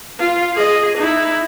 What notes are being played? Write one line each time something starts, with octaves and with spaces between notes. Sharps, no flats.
F4
G#4 D#5
D#4 E4